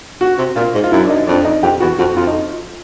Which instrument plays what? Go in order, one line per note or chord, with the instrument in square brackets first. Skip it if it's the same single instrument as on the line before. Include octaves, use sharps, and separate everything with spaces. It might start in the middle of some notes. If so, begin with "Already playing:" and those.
[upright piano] F#4
[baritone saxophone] C3
[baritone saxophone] A#2 [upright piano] F4
[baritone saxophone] G#2
[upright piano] F4
[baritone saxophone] F#2 [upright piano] E4
[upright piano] D4
D#4
[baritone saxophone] F2 [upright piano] D4
[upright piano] D#4
[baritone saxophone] F2 [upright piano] G4
[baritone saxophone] E2 [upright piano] F#4
[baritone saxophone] F2 [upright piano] F#4
[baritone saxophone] F2 [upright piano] F4
[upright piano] D#4